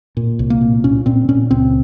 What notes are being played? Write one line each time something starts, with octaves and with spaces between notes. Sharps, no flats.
A#2
C2
A#3
A#2
A#2 C#4
A#2 C4
A#2 C#4
C#2 C4